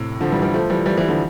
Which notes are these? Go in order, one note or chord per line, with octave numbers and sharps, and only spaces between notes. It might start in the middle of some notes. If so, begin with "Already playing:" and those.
Already playing: A2 C3
D3 F3
E3 G3
E3 G3
F3 A3
E3 G3
E3 G3
E3 G3
D3 F3